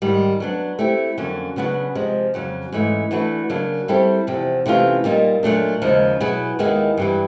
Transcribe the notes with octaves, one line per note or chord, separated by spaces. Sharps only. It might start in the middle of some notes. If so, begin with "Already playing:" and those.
G#2 D#3 G3
F#3 B3 D4
A3 C4 E4 G4
F2 D3 F#3 A#3 C#4
C#3 F#3 B3 D4 F#4
C3 F3 G#3
F2 C#3 F#3
G#2 E3 A3 C#4
E3 A3 D4 F#4 B4
C#3 F#3 A#3 D4
G3 C4 E4 A4 C#5
E2 C3 F3
C3 E3 A3 C#4 F4
A#2 G3 A#3 D#4
A#2 F#3 A3 D4
D#2 C#3 F3 G#3
B2 F#3 B3 E4 G#4
D#2 D#3 G#3 B3 E4
G2 E3 G3